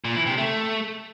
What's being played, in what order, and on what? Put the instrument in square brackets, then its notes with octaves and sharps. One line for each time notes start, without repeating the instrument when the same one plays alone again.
[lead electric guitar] A#2
E3
C3
A3